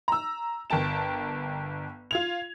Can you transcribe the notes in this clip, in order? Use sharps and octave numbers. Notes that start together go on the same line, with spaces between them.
A#5 E6
G1 A#4 G5 A5 E7
F4 G#6 F7